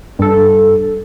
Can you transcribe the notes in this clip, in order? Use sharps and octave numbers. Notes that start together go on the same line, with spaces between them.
G2 A4